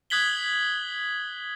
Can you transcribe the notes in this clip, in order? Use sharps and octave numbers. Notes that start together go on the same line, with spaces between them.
D#6 F#6 G#6 B6 F#7 G7